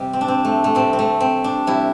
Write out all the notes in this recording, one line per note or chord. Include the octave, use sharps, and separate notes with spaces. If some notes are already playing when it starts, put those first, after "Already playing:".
Already playing: C3 G3
C4
D4
C4
A3
A3
C3 G3 C4
C4
A3
C4
D4
C3 G3 E4